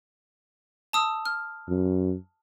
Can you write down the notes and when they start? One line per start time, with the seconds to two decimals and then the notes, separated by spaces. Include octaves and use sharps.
0.93 A5 D#6 E6
1.26 F6
1.69 F#2